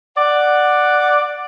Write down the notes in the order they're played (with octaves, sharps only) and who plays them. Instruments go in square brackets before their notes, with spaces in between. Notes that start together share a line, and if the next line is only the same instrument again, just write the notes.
[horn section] D5 F#5